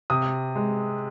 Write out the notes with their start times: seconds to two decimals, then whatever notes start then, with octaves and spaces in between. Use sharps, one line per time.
0.10 C3 D#6
0.55 G#3